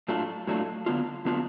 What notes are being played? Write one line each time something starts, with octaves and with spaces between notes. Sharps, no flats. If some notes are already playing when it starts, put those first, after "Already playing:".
A2 F#3 A3 D4 F4
A2 F#3 A3 D4 F4
D3 F#3 B3 D4 F4
D3 F#3 B3 D4 F4